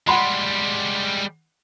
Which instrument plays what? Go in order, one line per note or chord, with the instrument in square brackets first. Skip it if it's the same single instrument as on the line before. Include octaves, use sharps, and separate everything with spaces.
[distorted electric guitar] G3 G#3 [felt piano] F#5 B5 C6